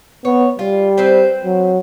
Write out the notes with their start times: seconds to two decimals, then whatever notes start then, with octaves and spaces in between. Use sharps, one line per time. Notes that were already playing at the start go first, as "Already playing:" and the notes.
0.25 B3 C#5
0.59 G3 F4
0.98 C4 B4 C5
1.45 F#3